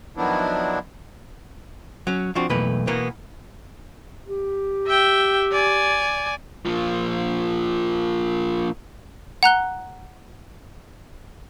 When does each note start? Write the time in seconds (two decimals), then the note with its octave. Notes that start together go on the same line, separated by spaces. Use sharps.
0.17 D#3 F3 F#3 B3 D4 E4
2.07 F#3 C#4
2.35 F3 C4 D4 F#4
2.50 B1 F2 E3 A3 A#3 B4
2.87 B2 E3 A#3 B3 A#4
4.27 G4
4.87 E5 G5
5.51 D5 G#5
6.65 A#2 F3
9.43 F#5 A#5 F#6 G7